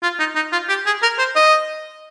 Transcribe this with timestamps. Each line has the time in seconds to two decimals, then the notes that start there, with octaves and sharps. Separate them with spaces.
0.03 F4
0.19 D#4
0.36 D#4
0.52 F4
0.69 G4
0.86 G#4
1.03 A#4
1.19 C5
1.36 D#5